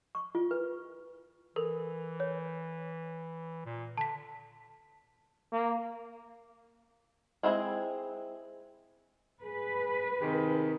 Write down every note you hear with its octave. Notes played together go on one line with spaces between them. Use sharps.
C#6
F4
B4
E3 A4 A#4
C#5
A#2
D3 A5 B6
A#3
G#3 C4 E4 G#4
G#4 B4
C3 D#3 G#4